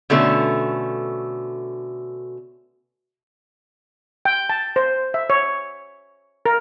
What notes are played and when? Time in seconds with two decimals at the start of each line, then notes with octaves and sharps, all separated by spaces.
0.10 B2 D3 A3 C#4
4.25 G5
4.49 A5
4.76 C5
5.14 E5
5.30 C#5
6.46 A#4